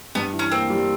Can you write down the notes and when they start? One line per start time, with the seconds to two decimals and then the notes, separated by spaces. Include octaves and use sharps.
0.15 G2 B3
0.33 E3
0.39 C#4
0.51 A#3 C4
0.70 G3